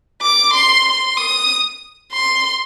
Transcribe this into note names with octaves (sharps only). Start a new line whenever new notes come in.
D6
C6
C6
D#6
C6